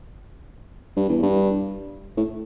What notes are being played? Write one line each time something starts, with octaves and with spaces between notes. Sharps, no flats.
G2
E2
G2
A2